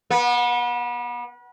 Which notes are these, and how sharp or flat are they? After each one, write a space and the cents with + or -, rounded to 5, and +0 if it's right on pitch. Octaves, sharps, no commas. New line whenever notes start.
B3 -35